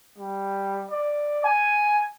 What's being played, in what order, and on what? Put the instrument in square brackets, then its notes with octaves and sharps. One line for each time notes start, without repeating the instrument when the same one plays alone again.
[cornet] G3
D5
G#5